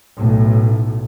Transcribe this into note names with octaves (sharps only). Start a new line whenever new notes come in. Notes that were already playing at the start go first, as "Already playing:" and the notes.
B1 A2